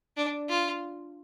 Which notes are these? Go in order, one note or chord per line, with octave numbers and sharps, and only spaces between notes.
D4
F4